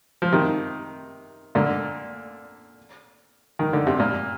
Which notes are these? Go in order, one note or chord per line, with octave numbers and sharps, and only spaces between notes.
F3
C3 D#3
A#2 D3
D#3
D3
C3
A#2